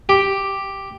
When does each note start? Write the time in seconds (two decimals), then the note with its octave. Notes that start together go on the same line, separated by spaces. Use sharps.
0.09 G4